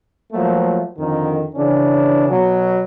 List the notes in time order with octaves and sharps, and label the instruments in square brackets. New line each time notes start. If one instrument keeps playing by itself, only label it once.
[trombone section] F3 F#3 A3 A#3
F2 D3 D#3
C#3 E3 C#4 D4
B2 F#3